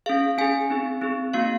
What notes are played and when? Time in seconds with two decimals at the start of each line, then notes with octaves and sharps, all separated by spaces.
0.06 C#4 G#4 F5
0.38 C#4 G#4 G#5
0.70 C4 D#4 G#4
1.02 C4 D#4 G#4
1.34 A#3 D#4 F#4 F5